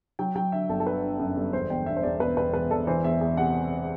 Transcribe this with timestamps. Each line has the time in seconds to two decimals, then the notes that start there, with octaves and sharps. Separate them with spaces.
0.19 F#3 G5
0.35 F#3 G5
0.52 D3 E5
0.69 G1 A4
0.80 A4
0.86 D3 B4
1.03 D3
1.19 F#2
1.36 G1
1.53 E1 C5
1.70 E1 G5
1.86 D3 E5
1.97 C5
2.03 E1 D5
2.20 E1 B4
2.37 E1 B4
2.54 E1 B4
2.70 E1 A4
2.87 E3 C5
3.04 E2 E5
3.21 E2 E5
3.37 C3 F#5